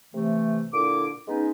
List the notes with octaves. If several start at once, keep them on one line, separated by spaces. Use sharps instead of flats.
C3 E3 A3
A#2 D3 E4 D6
G#3 B3 C#4 D#4